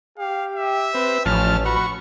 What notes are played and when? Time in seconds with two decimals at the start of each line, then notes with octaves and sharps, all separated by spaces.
0.18 G4 F5
0.56 E5
0.95 C4 B4
1.26 A1 A2 F3 C#4 A5 F6
1.65 F#4 B5 C#6